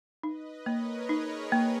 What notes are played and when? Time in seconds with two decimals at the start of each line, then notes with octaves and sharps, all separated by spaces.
0.23 D#4 B4 D#5
0.66 A#3 A#4 C#5
1.09 D#4 G#4 B4
1.52 A#3